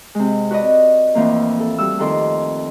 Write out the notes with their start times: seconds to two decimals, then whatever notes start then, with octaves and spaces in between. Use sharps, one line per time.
0.15 C3 G#3
0.50 F#4 B4 D5 D#5
1.15 F2 A2 E3 F3 A3 A#3
1.60 A4
1.78 G3 F#4 E6
1.99 F2 D#3 A4 C6 D6